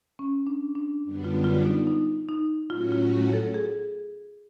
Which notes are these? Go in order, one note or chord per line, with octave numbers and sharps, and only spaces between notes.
C#4
D4
D4
F#2 D3 G3 B3 D4
F4
F4
D#4
D#4
D#4
A2 F#3 A3 C#4 F4 F#4
F4
A4
G#4